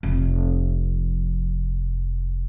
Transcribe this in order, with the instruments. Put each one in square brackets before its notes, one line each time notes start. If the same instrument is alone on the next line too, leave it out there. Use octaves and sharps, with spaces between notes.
[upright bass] F1 F2